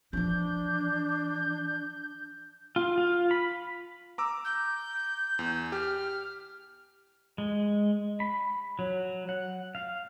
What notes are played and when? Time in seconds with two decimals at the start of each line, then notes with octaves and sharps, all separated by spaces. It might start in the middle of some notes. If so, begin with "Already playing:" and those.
0.13 E3 F3 D4 G6
2.76 F4
2.98 F4
3.31 B5
4.18 A#5 D6 E6
4.45 G6
5.39 E2
5.72 G4 F6
7.38 G#3
8.20 B5
8.79 F#3
9.29 F#5
9.75 F5